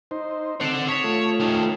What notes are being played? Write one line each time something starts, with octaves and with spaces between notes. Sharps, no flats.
D#4 C5
C4 A4 F#5 C7 D7 E7
C#5 D#6 B6 F7
A3 F4 A4
D#3 C#4